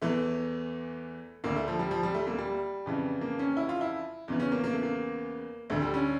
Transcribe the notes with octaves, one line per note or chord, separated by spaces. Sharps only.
E2 E3 A3
D2 D3 A#3
A3
F3
G3
F3
G3
A3
A#3
G3
F2 C#3 E3
A#3
C#4
E4
F4
E4
E2 C#3 E3
C#4
A#3
A#3
A3
A#3
D2 D3 A3
G3
C#4